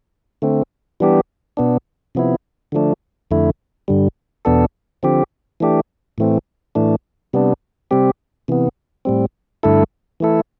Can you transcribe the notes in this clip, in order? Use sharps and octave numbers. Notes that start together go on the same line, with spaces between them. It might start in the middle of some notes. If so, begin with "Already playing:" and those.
D3 A3 C4
E3 G3 B3 D4 G4
B2 B3 D4
C3 F3 B3 E4
D3 F3 A3 D4
F2 D3 A3 E4
G2 D3 G3
E2 B2 B3 D4 A4
D3 F3 C4 G4
E3 A3 D4 G4
A2 E3 A3 C4
A2 E3 A3 D4
C3 G3 B3 D4
C3 G3 C4 G4
C3 E3 B3
A2 G3 C4
G2 D3 A3 E4 A4
E3 A3 E4 A4